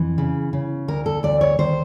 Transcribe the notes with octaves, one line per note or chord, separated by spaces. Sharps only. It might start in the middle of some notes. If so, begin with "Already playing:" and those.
Already playing: F2 E3
C#3
C#3
D2 A#4
A4
D2 D5
C#5
D#2 C5